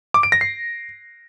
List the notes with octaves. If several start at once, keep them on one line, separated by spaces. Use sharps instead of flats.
D6
D7
A#6
C7